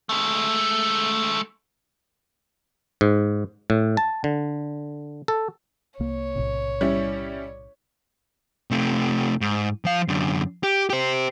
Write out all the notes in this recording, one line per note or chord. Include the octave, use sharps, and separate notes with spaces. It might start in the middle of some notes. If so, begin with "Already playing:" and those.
G#3 A3
G#2
A2
A5
D3
A4
C2 A#3 C#5
B1 A2 C3
G3 C#4 E4
C3 A3
G#2
F3 F5
F#2 D3
G4
G4 C5